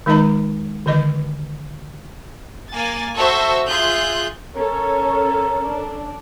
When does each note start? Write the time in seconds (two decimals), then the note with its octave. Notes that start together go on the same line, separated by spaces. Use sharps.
0.06 D#3 G#3 D#4 B4 D#5 A#5
0.86 D3 D#3 B4 D#5
2.73 A#3 G#5 A6
3.18 F#4 A4 C5 E5 C#6 E6
3.68 F4 G#4 E5 C6 F#6 G6
4.55 C#4 A4 A#4 C#5
5.63 D4